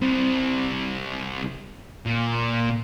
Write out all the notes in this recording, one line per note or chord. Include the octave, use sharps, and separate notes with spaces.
C2 C4
A#2